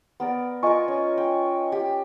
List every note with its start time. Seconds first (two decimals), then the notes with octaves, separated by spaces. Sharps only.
0.20 B3 A#4 D5
0.63 F4 A#4 D#5 G#5 C#6
0.88 C#4
1.18 G5
1.72 G4